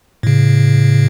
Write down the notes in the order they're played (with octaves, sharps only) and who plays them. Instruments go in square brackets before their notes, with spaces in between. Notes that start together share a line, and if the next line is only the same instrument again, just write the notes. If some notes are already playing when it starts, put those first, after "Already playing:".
[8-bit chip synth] A2 C#3